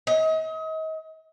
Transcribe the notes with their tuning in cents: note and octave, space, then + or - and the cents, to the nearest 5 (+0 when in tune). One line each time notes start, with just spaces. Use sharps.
D#5 +35